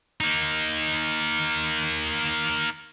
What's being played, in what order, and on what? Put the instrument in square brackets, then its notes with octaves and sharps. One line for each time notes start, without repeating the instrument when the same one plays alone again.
[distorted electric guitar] A#3 D#4